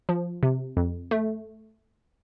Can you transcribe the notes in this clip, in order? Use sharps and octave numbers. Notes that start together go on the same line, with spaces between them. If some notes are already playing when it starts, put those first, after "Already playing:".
F3
C3
F2
A3